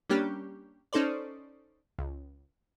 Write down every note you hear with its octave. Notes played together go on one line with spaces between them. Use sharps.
G3 A#3 C#4 D4 G4
C#4 D#4 A4 C5 D5
C#2